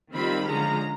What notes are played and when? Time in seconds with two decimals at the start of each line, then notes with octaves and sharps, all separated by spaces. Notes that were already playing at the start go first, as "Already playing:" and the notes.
0.14 D#3 G3 C4 F4 B5
0.47 D3 F3 G#3 C#4 A#5